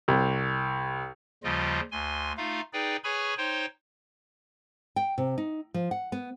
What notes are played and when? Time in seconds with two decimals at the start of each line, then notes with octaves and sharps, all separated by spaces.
0.08 C2
1.44 D#2 C#3 F3 G3 F4 D#5
1.91 D2 G#5 C6
2.37 A3 D#4 F4 F5
2.73 D#4 G#4 B4 D5 G5
3.04 G#4 B4 C#5 G#5 B5 C#6
3.38 D#4 C5 C#5 G5 C6
4.96 G5
5.18 C3
5.38 D#4
5.74 F3
5.91 F#5
6.12 B3